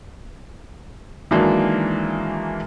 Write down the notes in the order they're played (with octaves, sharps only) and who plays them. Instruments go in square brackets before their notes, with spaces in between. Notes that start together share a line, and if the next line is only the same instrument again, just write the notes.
[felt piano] D#3 E3 F#3 G#3 A#3 D4